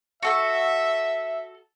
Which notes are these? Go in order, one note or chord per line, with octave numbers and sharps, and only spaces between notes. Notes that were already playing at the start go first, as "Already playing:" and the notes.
F#4 A4 E5 C#6